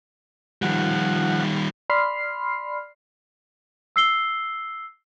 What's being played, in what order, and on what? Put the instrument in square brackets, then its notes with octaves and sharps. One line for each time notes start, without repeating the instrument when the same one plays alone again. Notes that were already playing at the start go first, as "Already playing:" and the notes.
[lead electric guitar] D#3 G3 [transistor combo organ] F3 F#5
[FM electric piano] D5 B5 C6 F6 C7
[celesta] E6 C7 G7